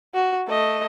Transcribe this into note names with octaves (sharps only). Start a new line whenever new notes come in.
F#4
A3 D#5